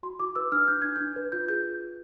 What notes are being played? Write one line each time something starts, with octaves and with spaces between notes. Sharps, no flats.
F#4 C6
F#4 D6
B4 E6
D4 F6
D4 G6
D4 G#6
D4 G6
B4
F4 G6
G#4 G6